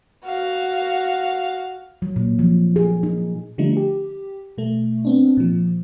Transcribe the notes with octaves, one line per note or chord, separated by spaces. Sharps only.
F#4 F5
F#3
A#2
F3
G#4
D#4
D3 F3 G3 A3 D#4
G4
B2 A3
B3 C4 D4
A#2 F3